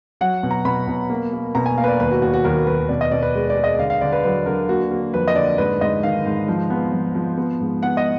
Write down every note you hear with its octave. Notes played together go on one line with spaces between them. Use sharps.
F#3 F#5
B2
A#5
B2 B5
B2
A#3
A#3
B2 A#5
G#5
A#3 F5
B4
D5
D#2 B4
F#4
D#2 F#4
F#4
D#2 A#4
D#2 B4
B2 D5
D#5
B2 D5
B4
G#3
D5
G#3
D#5
D3 F5
F5
D3 D5
B4
F#3 B4
D3 A#4
A#3 F#4
A#3
F2 B4
D#5
D3 D5
G#2 B4
G#2 D#5
D#3 F5
G#2
F3
B3
F3
F3
B3
G#2
B3 F#5
D#5